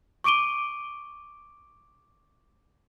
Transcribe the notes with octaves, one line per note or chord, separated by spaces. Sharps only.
C#6 D6 D7 D#7 G7